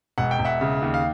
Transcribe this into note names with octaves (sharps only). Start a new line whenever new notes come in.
E1 F#5
G5
E1
E5 F#5
C#3
D#2
F5